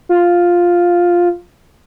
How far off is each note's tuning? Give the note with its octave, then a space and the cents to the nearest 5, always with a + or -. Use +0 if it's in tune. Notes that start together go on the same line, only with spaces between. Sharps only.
F4 +5